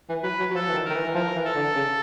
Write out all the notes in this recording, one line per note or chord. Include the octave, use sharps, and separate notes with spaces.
E3
F#3 B4
F#3
F#3
F3 A4
E3
D#3
A#4
D#3
E3
E3
F3 A#4
E3
A4
D3
C#3